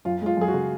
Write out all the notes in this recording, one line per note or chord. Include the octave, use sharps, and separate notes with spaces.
F#2 F4
G#3 F4
F#2 G#4
F#4
C#3